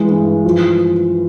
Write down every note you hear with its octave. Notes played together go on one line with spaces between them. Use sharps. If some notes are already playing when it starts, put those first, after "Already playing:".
Already playing: E3 G#3
G2
F3